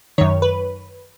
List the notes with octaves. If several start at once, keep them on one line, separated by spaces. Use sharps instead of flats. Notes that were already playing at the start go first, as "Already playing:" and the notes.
F#2 D#3 C#5
B4